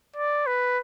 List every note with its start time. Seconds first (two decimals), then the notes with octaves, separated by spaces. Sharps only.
0.16 D5
0.47 B4